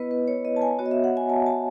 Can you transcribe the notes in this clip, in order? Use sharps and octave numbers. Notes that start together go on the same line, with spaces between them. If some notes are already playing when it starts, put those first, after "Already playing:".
Already playing: B3 E4 B4 D#5
B4
C#5
D#5
A5
G#5
B3 F#4 C#5
D#5
E5
F#5
G#5
A5
A5